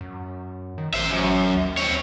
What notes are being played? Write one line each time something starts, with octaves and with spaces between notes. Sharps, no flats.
F#2
D#3
A1 C5 E5
F#2
D#2
C4 C#5